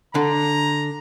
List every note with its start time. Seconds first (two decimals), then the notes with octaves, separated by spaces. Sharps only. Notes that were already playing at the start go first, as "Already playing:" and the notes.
0.15 D3 A#5